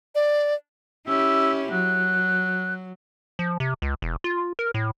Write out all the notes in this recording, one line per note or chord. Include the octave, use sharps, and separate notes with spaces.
D5
C#4 E4 G4 E6
F#3 F#6
F3
C3
C#2
E1
F4
A#4
A2